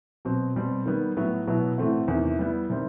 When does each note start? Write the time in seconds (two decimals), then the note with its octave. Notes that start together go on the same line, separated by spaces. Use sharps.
0.25 B2 F#3 C4
0.56 B2 G3 C4
0.86 D#3 G3 B3
1.17 A2 F#3 B3
1.47 B2 F#3 B3 E4
1.78 A2 E3 A3 C4 F#4
2.08 E2 C3 D#3
2.39 G3 B3 E4
2.70 C3 D#3 G3 C4